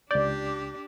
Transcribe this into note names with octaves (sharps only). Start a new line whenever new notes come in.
C#2 D4 G4 D5 G6